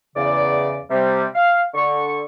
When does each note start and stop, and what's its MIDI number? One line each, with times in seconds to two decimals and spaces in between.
0.16 0.79 40
0.16 0.79 49
0.16 0.79 74
0.91 1.25 48
0.91 1.25 55
1.35 1.63 77
1.74 2.23 50
1.74 2.23 85